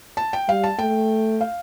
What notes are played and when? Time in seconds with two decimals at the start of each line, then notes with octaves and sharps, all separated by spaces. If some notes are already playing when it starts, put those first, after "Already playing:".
0.17 A5
0.33 G5
0.48 G3 F5
0.64 A5
0.79 A3 G5
1.41 F5